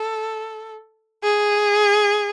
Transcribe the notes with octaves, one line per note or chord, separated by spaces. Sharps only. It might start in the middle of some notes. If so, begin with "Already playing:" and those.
Already playing: A4
G#4